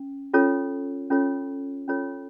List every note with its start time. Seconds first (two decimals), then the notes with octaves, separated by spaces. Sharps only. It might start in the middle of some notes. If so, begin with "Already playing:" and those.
Already playing: C#4
0.34 C#4 F4 A4 C#5
1.10 C#4 F4 A4 C#5
1.88 C#4 F4 A4 C#5